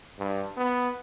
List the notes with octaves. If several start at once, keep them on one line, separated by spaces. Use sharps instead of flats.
G2
B3